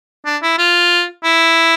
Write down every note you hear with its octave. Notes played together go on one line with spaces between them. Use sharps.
D4
E4
F4
E4